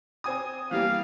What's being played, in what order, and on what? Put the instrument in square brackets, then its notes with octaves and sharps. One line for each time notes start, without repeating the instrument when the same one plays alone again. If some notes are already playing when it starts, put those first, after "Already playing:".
[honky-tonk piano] C4 G#5 D#6
[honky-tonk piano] E3 G3 A#3 [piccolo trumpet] F5